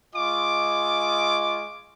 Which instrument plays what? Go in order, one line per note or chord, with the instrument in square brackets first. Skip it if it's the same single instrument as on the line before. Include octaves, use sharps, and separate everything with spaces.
[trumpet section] G#3 F4 D#5 G#5 C#6 D6